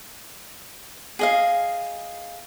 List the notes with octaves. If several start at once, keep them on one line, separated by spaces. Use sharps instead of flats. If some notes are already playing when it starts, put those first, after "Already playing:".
G#4 D#5 F5